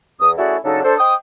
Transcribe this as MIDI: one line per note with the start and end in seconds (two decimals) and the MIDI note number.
0.20 0.32 40
0.20 0.32 87
0.37 0.57 57
0.37 0.57 61
0.37 0.57 64
0.37 0.57 66
0.37 0.57 68
0.37 0.57 74
0.64 0.81 49
0.64 0.81 54
0.64 0.81 62
0.64 0.81 63
0.64 0.81 69
0.84 0.97 62
0.84 0.97 69
0.84 0.97 72
0.99 1.14 72
0.99 1.14 75
0.99 1.14 79
0.99 1.14 87